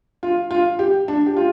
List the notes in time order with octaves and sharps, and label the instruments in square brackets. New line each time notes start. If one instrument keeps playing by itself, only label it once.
[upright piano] F4
F4
G4
D4
G4
F4